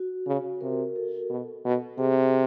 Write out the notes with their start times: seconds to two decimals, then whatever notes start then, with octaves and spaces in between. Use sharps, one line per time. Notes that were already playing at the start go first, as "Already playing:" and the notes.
Already playing: F#4
0.26 C#3
0.61 C3 A#4
0.96 A4
1.30 B2
1.65 B2
1.98 C3 G#4